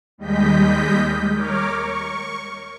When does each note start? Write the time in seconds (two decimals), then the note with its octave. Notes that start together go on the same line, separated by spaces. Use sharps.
0.18 D#2 G3 G#3 D#5 G6 B6
1.33 A#4 C#5 D6 F6
1.70 C#6